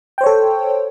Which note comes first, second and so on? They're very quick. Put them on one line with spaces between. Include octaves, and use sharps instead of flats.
G5 C5 C#5 A4